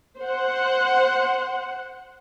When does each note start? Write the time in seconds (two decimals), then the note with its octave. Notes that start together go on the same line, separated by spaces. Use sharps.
0.20 C5 F#5